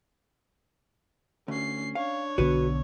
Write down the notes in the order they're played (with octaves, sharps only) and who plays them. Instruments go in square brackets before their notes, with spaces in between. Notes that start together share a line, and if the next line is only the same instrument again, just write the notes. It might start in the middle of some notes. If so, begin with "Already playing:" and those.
[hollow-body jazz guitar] D2 [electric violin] C#4 C7
[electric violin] D4 C#5 [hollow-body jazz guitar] F5
[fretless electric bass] B1 D3 B3 [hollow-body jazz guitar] F#4 B4